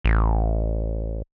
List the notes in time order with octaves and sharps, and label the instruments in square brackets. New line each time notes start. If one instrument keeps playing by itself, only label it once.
[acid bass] A1